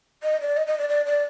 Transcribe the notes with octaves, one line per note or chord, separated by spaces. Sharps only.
D#5
D5
D#5
D#5
D5
D5
D5